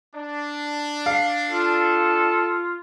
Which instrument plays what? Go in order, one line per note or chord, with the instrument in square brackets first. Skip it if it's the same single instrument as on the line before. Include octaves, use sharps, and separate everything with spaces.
[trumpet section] D4
[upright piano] F5
[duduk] F4 [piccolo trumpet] A4